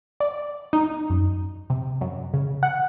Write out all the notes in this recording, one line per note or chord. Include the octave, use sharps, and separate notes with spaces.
D5
D#4
F#2
C3
F#2
C#3
F#5